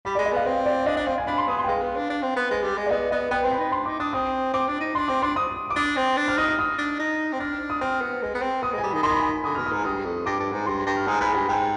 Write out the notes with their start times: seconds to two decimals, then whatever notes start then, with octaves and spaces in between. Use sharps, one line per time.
0.05 G3 B5
0.15 G#3 D5
0.26 D#5
0.33 B3 F5
0.46 C4 F5
0.66 D5
0.86 D4 D#5
0.97 D4 D#5
1.07 C4 F5
1.18 G#5
1.27 D4 B5
1.38 C6
1.48 B3 D#6
1.59 C6
1.64 G5
1.68 G#3 F5
1.82 B3
1.96 D4
2.10 D4
2.22 C4
2.36 B3
2.51 G#3
2.63 G3
2.77 G#3
2.86 D5
2.90 B3 D#5
3.11 B3 D#5
3.31 B3 G5
3.45 C4
3.51 B5
3.59 D#4
3.72 D4 C6
3.86 D#4 D6
4.00 D4 D#6
4.13 C4 D#6
4.54 C4 D6
4.68 D4
4.81 D#4
4.95 D4 C6
5.08 C4 D6
5.22 D4 C6
5.36 D#6
5.70 D6
5.76 D4 D#6
5.96 C4
6.17 D4
6.28 F6
6.37 D#4 D#6
6.48 F6
6.59 D#6
6.78 D4
6.99 D#4
7.33 C4
7.40 D4 F6
7.70 D#6
7.81 C4 F6
8.01 B3
8.22 G#3
8.35 B3
8.42 C4
8.62 B3 D#6
8.73 G#3
8.78 G3 G#5
8.90 D#3 B5
9.03 D#3 C6
9.11 B5
9.19 G#5
9.28 B5
9.44 D3 D#6
9.55 B2 F6
9.66 D#6
9.72 G#2
9.85 G2 D#6
10.05 F2
10.26 G2 D6
10.40 G2
10.53 G#2
10.66 G2 C6
10.86 G2
10.96 F6
11.07 G#2 D#6
11.21 G#2 B5
11.34 G2 G#5
11.48 G#2 G5